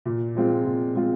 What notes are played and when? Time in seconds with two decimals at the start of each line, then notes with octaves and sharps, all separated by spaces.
0.06 A#2
0.35 F3 G#3 C4 F4
0.65 A#2
0.95 F3 G#3 C4 F4